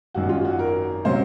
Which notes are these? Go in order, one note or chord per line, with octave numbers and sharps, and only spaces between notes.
G#1 F#2 D#3 F#4
F4
F#4
A#4
C3 F#3 C#4 C5